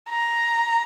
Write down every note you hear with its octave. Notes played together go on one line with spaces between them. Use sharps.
A#5